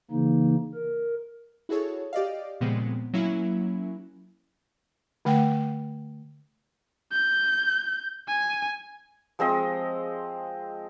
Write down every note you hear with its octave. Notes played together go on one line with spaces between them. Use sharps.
C#3 E3 A#3 D#4
A#4
E4 F#4 G#4 A4 C#5
G4 D5 D#5 F5
A#2 C#3 F3 G#3 B3 C4
F#3 A#3 C#4 E4
D3 A3 F#5 G5
G6
G#5
F3 G#3 C4 D#5